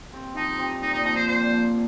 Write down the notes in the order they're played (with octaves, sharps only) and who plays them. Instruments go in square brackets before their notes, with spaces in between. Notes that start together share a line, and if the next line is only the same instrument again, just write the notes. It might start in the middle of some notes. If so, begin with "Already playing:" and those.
[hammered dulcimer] C4 G4
[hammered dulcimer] F3 [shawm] D#4
[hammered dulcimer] C4 G4
[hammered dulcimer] A#2 [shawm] D#4
[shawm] D#4
[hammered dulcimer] F3 A#3 [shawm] D#4
[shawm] C5
[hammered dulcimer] A#2 [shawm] C5
[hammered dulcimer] F3 A#3